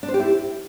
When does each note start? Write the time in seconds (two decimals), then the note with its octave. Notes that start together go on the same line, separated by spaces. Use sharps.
0.03 D4
0.08 C5
0.14 G4
0.20 E4